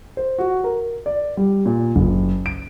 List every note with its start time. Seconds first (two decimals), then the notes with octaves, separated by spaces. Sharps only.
0.17 C5
0.39 F#4
0.64 A#4
1.06 D5
1.37 G3
1.66 A#2
1.96 F#1
2.46 D7